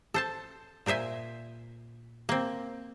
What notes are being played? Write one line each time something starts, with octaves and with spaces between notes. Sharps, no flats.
A4 C5 A5
A#2 A#4 C5 E5 G#5
A#3 C4